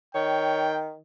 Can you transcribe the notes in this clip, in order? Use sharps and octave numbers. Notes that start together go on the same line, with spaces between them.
D#3 C#5 G5